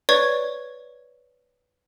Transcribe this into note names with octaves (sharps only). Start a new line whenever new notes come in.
B4 C#5 D5 C#6 G#6